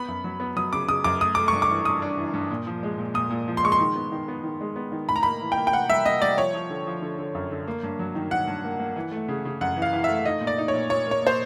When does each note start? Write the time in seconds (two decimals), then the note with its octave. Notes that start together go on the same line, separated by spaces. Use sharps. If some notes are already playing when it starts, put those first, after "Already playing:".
Already playing: B3 B5
0.08 F#2
0.24 F#3
0.40 B3
0.56 F#3 D#6
0.73 C#3 D6
0.88 C#3 D#6
1.04 F#2 D6
1.21 A3 D#6
1.35 A3 D6
1.48 G2 C#6
1.62 D6
1.69 E3
1.85 G2 D#6
2.02 D4
2.18 E3
2.34 G2
2.51 A#2
2.67 F3
2.83 G#3
2.98 A#2
3.14 A#2 D#6
3.30 A#2
3.48 F3
3.57 C6
3.64 G#3 C#6
3.72 C6
3.80 D#3
3.96 B3
4.12 D#3
4.28 B3
4.44 D#3
4.61 G#3
4.76 B3
4.92 D#3
5.08 A2 B5
5.16 A#5
5.23 A#3 B5
5.41 E3
5.52 G5
5.57 A#3
5.67 G5
5.73 A#3 F#5
5.89 G3 E5
6.05 A#3 D#5
6.22 G3 D5
6.37 F3 C#5
6.54 F3
6.70 D3
6.87 F3
7.02 D3
7.18 D3
7.35 F#2
7.51 D3
7.67 A#3
7.83 G2
7.99 F#3
8.15 D#3
8.31 D#3 F#5
8.47 G2
8.64 A#3
8.79 A#3
8.96 E3
9.12 A3
9.28 C#3
9.45 C#3
9.61 F#2 F#5
9.76 E3
9.82 F5
9.93 E3
10.04 A3 E5
10.26 D#4 D#5
10.41 A#2
10.47 D5
10.58 D#4
10.68 C#5
10.73 A#2
10.90 A#2 C#5
11.07 A#3 C#5
11.22 A#2 C5